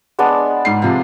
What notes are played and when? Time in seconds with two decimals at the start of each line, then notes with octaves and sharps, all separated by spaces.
0.19 G#3 B3 D4
0.65 G#2 C7
0.82 C3 F3